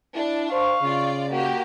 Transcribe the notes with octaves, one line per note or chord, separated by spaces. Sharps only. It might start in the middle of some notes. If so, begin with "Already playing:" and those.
D4 E4
C5 F5 C#6
C#3 F4 D5
A#3 F#4 G4